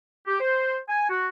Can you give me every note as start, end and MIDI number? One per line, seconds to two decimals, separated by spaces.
0.27 0.39 67
0.40 0.77 72
0.89 1.07 80
1.10 1.28 66